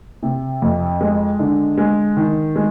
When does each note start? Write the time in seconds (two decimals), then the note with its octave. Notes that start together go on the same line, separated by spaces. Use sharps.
0.23 C3
0.62 F2
1.01 G#3
1.39 D3
1.78 G#3
2.17 D#3
2.56 G#3